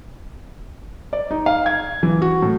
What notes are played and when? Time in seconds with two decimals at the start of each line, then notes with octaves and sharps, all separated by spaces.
1.13 D5
1.31 D#4
1.46 F5
1.66 G#6
2.03 E3
2.22 F#4
2.42 A2